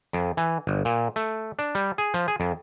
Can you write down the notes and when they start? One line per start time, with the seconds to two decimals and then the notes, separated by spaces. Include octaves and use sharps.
0.13 F2
0.37 E3
0.67 G1
0.85 A#2
1.16 A3
1.59 D4
1.75 G3
1.98 G#4
2.14 F3
2.28 G#4
2.40 F2